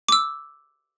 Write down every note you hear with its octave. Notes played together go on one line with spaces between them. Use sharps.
D6 E6